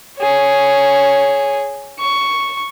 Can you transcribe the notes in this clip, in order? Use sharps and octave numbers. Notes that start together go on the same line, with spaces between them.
G#4 C#5
C#6